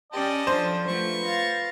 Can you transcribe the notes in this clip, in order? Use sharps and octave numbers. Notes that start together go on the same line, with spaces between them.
C#4 G4 B4 D5 D#5 G5 A5
F3 D4 A4 C5 D5
A3 F4 F#4 B4 C#6
F5 A6 A#6